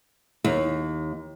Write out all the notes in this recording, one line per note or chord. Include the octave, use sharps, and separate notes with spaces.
D#2